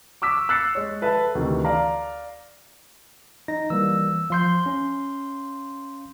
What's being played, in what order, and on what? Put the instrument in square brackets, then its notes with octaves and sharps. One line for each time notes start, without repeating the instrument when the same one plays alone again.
[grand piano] C#6 D6 E6 B6
E6 F#6 A6 C7 C#7
G#3 C#5
A4 B4 E5 A5
D2 C3 D#3 E3
D5 F5 A#5
[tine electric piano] D#4 [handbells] A#6
[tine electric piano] E3 G3 A#3 [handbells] E6
[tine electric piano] F3 C7 [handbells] F5 C6 G6
[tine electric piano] C#4